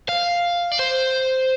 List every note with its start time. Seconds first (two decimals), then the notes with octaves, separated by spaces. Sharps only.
0.09 F5
0.72 D5
0.79 C5